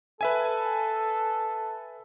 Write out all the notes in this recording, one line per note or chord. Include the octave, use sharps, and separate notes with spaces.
A4 B4 E5 G#5